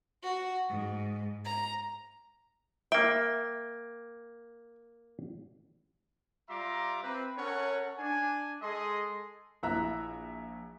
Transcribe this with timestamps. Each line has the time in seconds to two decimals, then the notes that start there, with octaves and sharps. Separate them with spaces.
0.24 F#4
0.69 G#2
1.45 A#5
2.92 A#3 E5 G5
6.49 G3 F4 E5 A#5 C6 D6
7.03 C4 B4
7.38 C#4 A4 A#4 C#5 F#5
7.98 D4 G#5
8.62 G#3 G#4 A4 D#5 C6
9.63 A#1 E4 E5 A#5 F#6